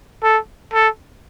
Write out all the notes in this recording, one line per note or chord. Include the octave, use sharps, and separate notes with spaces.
A4
A4